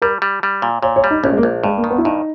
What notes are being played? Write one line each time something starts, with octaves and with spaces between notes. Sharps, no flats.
G3 A#4
G3
G3
A#2
A#2 C#5
C#5
G3
D#4
A#1 C#4
G#3
A#3
A#1
G2 G#3
A#3
D#3
B3
E4
G2 D#4